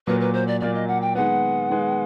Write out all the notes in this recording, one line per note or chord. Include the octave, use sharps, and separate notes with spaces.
A#2 F#3 A#3 B4
B4
C5
D5
A#2 F#3 A#3 D5
D#5
F#5
G5
D#3 G#3 B3 F#5
D#3 G#3 B3